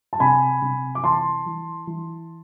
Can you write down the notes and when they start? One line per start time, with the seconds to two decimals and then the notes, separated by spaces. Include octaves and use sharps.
0.13 A5
0.20 C3 G#5 B5
0.62 C3
0.95 D6
1.04 E3 A5 C6
1.46 E3
1.87 E3